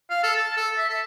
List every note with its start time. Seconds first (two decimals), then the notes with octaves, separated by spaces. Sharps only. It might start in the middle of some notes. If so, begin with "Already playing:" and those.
0.10 F5
0.23 A4
0.36 A5
0.57 A4
0.78 E5
0.89 A4